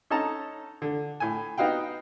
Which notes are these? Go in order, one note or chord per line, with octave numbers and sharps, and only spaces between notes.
C#4 D#4 A4 A5 A#5
D3
A2 G#5
B3 D#4 F#4 F5 G5